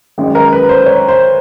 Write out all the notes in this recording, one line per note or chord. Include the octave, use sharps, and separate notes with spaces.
G#1 F#2 D#3 G#3
A#4
B4
C5
C#5
C5